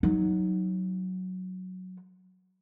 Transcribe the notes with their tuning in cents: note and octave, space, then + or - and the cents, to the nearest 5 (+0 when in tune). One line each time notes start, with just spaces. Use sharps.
F#3 +0 D#4 +10